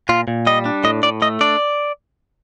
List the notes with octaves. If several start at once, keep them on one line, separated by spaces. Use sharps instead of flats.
A#2 F4
A#2
G3 D#5
D4
A2 D#5
A2 D5
A3 D#5
D4 D5